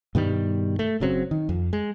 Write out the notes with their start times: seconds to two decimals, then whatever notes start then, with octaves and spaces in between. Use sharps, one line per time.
0.15 G2 B2 D#3 G3
0.79 A3
1.00 F#1 C#3 F#3 C4
1.31 D#3
1.49 F2
1.73 G#3